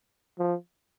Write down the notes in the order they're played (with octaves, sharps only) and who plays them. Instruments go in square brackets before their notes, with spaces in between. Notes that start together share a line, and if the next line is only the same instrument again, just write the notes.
[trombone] F3